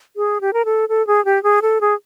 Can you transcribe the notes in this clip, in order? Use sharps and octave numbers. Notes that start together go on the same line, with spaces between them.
G#4
G4
A#4
A4
A4
G#4
G4
G#4
A4
G#4